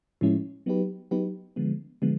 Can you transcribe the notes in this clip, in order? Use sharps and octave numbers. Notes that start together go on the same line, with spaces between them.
A2 F3 G#3 C#4 E4
F#3 B3 D#4 G4 B4
F#3 B3 D#4 G4 B4
D3 F3 G#3 B3
D3 F3 G#3 B3